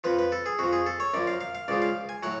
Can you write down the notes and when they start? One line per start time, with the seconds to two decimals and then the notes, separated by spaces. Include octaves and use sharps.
0.04 F2 F3 B4
0.19 B4
0.32 A4
0.46 G#4
0.59 F2 F3 F#4
0.73 G#4
0.86 A4
1.00 C#5
1.14 F#2 F3 D5
1.27 F5
1.41 F5
1.55 F5
1.68 C#2 C#3 F3 D5
1.82 F5
2.09 G#5
2.23 A2 F#3 F#5